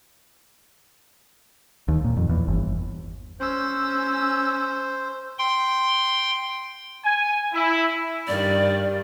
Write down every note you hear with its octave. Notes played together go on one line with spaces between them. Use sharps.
D#2
A#2
F2
E2
G1
C#4 C5 E6
G5 C6
G#5
E4
G2 D#3 G3 D5